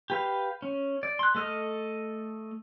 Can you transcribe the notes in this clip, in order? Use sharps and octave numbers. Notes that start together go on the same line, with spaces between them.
G4 B4 F5
C#4
D5
C6 F#6
A3 A4 D#5 F6